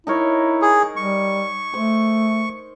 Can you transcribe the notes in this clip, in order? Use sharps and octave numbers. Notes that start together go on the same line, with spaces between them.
D#4 E4 A#4 C#5
G#4
G3 C#6
A3 C5